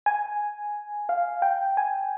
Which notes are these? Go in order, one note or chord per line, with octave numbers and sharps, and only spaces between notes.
G#5
F5
G5
G#5